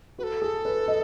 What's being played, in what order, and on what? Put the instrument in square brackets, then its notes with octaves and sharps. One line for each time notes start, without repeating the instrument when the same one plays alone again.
[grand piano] F#4 [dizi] B4
[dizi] A4
[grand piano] G#4
B4
D#5